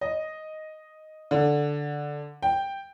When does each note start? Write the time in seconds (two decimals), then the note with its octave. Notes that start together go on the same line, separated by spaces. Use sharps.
0.01 D#5
1.31 D3
2.42 G5